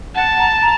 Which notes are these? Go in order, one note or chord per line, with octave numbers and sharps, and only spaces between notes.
F#5 A5
A#5
A#5